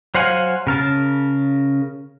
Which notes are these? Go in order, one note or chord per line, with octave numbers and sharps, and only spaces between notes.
F#3 C5 F5 F#5 G#5
C#3 A#4 A5